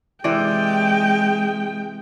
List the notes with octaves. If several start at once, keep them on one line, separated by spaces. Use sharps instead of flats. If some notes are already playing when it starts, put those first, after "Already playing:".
C3 E3 G#3 D5 G5